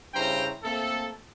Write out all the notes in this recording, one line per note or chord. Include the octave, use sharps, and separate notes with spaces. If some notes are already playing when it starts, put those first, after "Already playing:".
G2 C#3 E4 C5 G5 A#5
A3 A#3 C4 A4